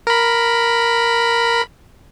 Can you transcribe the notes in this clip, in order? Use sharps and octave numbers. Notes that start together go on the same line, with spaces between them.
A#4 B5